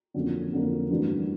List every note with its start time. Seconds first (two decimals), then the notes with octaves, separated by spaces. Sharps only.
0.14 F2 D3 F#3 A#3 C#4
0.52 F2 D3 F#3 A#3 C#4
0.90 G2 E3 A3 D4 F#4